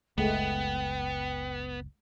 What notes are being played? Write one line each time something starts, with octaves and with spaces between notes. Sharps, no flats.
F#1 C#2 G#3 A3 B3 G5